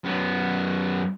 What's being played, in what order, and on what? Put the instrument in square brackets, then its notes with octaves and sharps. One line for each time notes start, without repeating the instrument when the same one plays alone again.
[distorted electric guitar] F#2 B3